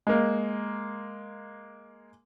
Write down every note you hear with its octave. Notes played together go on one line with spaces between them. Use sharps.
G#3 A#3